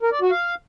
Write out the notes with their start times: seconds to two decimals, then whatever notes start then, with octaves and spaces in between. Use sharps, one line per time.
0.03 A#4
0.12 D5
0.22 F#4
0.31 F5